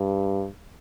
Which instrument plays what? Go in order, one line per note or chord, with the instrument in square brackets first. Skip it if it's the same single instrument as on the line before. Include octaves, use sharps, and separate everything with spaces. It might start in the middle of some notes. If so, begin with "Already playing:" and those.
Already playing: [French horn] G2